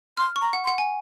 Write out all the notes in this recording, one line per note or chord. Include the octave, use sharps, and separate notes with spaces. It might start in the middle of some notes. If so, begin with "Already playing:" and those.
C6 F6
C#6
A#5
F#5
C6
F#5
G#5